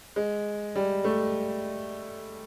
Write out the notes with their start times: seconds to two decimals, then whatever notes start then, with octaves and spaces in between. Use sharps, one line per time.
0.16 G#3
0.76 G3
1.04 A3